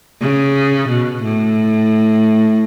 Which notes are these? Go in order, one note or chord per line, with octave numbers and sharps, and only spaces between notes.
C#3
B2
A2